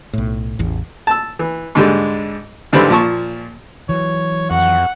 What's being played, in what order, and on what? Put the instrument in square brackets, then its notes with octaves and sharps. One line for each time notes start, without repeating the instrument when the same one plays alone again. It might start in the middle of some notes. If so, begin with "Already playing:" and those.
[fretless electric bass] B1 A2
A1 E2
[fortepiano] A5 E6
E3
G#2 D3 G3 G#3
G#1 D3 E3 G3 C5 B5
A#2 F3 A5 C#6
[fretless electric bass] E3 F#3 [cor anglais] C#5
[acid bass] F2 [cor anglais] F#4 [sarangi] F#5